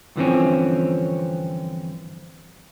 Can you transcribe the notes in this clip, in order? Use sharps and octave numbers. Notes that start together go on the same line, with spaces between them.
G2 D3 E3 F3 C4 C#4